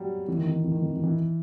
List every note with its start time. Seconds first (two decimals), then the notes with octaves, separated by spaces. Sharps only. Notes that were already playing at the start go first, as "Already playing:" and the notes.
Already playing: F#3 G3
0.28 E3
0.38 D#3
0.48 E3
0.64 E3
0.72 D#3
0.82 E3
0.93 E3
1.03 E3